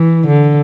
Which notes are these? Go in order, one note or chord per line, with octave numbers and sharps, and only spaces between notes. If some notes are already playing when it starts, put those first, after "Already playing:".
Already playing: E3
D3